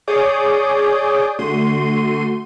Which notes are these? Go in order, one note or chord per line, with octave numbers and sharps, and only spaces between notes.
G#4 C#5 D5 D6 D#6 G6
D3 A3 F#4 C6 D#7